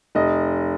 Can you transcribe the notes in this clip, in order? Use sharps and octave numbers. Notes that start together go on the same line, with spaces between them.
F1 D#5